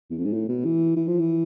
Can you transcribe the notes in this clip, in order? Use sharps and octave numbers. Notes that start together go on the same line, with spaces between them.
E2
F2
G#2
A2
B2
E3
E3
F3
E3